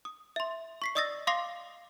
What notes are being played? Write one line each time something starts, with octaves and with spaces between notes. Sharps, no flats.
D#6
E5 C6
C#6 B6 C7
D5 D#5 D#6 E6 A6 A#6
F5 C6 D6 D#6 A#6 C7